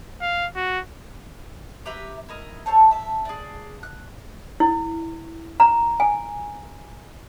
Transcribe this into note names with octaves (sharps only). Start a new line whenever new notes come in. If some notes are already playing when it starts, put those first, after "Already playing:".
F5
F#4
G4 B4 E5 A#5
E4 A#4 D#5
A4 C5 C#5 A5
E5 A5
D4 G#4
F#6
E4
A#5
G#5